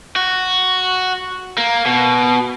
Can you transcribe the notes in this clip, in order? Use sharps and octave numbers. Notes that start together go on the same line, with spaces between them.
F#4
A#3
B2